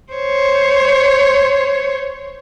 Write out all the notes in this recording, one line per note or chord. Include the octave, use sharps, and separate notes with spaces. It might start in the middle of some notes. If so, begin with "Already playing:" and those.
C5 C#5